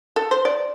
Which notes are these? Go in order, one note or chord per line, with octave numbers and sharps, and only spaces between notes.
A4
C5
D5